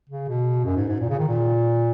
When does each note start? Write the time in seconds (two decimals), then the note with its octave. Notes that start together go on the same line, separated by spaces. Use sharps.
0.10 C#3
0.29 B2
0.65 F#2
0.76 G#2
0.88 G#2
1.00 A#2
1.10 C#3
1.19 D#3
1.28 A#2